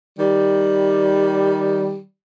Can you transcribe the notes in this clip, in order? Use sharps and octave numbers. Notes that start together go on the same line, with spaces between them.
D#3 G3